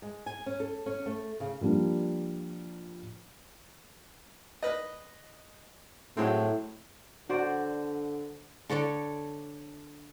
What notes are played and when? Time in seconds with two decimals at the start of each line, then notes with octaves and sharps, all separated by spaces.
0.02 G#3
0.26 G#5
0.46 C#4
0.60 A4
0.86 C#4
1.06 A3
1.40 C#3
1.61 F3 G3 A#3 D4
4.63 B4 D#5
6.17 A2 F#3 G#3 C4
7.29 D3 F#4 C5 D5
8.69 D3 A4 C#5 D5